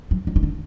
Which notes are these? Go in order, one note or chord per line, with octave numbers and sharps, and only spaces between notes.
F#3
F#3
D#3
D3